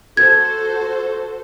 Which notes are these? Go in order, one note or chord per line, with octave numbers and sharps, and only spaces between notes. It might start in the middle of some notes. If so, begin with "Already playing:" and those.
F#4 A4 C5 G#6